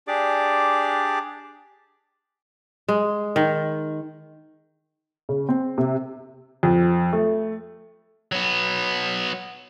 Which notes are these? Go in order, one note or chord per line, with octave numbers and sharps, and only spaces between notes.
D4 G4 G#4 D5 D6
G#3
D#3
C#3
C4
C3
F2
A3
F#3 B3